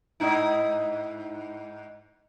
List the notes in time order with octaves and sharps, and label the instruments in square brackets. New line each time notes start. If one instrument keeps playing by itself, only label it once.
[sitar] G#2 D#4 E4